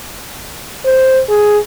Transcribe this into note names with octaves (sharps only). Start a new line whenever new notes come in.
C5
G#4